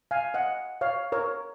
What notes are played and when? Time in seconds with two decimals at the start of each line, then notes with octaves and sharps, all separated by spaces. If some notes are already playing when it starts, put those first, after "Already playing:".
0.11 F5 G#5
0.34 D#5 F#5
0.81 C#5 F5
1.12 A#4 C#5